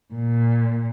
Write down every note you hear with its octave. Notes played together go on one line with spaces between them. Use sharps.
A#2